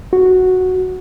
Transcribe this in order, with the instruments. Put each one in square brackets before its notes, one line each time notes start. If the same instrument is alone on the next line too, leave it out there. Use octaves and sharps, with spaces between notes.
[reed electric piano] F#4